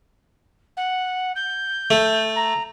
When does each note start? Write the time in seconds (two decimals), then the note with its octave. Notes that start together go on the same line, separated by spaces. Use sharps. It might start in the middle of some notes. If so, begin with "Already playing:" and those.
0.77 F#5
1.35 G6
1.91 A3
2.36 A#5